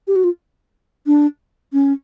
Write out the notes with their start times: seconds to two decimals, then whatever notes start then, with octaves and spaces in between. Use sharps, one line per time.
0.07 G4
0.16 F#4
0.24 F4
1.07 D4
1.73 C#4